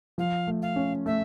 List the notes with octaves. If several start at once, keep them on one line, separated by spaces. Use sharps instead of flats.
F3 F5
A3
F5
C#4
A3 E5